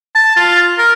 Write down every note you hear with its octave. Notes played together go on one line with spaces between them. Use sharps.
A5
F4
A#4